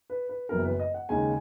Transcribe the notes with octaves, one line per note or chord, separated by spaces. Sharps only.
B4
B4
F#1 F#2 E3 B3 A#4
B4
D#5
F#5
D#2 C#3 G#3 D#4 G#5